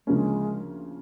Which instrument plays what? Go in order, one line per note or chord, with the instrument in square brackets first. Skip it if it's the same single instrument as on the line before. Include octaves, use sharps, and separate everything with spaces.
[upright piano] D2 C#3 F3 A#3 C#4 [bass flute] G#3